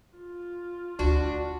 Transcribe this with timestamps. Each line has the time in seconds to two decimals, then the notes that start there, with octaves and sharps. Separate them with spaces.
0.16 F4
0.99 D2 D4 F#4